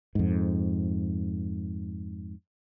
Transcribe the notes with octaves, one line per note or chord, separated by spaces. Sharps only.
F2 G#2